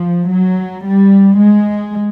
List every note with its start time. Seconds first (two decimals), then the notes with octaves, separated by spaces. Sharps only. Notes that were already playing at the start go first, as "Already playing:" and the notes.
Already playing: F3
0.28 F#3
0.84 G3
1.39 G#3